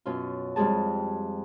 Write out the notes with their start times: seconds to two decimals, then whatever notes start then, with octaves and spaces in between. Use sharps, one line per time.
0.06 F#2 B2 C#4 F4
0.56 F2 G3 G#3 C4 G#4 A5